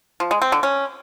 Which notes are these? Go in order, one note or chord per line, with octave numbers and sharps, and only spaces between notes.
F3
G#3
C4
D3
C#4